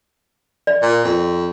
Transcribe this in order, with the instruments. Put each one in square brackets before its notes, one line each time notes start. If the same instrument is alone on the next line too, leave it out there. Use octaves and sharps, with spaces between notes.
[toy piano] D5
[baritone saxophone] A#2
F2